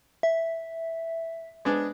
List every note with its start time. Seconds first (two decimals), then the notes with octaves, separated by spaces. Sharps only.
0.23 E5
1.65 G#3 B3 D4